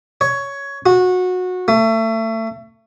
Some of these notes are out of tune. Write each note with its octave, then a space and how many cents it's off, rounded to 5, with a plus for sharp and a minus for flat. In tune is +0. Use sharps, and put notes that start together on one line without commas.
C#5 +10
F#4 -20
A3 +30